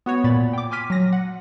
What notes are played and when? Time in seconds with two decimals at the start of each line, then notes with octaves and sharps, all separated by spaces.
0.06 B3 F#4 B4 C#5
0.24 A#2 B5 A6
0.53 G5 D6
0.71 G#5 C6 D6 F6 B6 D#7
0.90 F#3 A#6
1.13 F#5